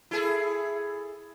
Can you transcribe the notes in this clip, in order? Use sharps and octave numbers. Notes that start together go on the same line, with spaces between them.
E4 G#4 A4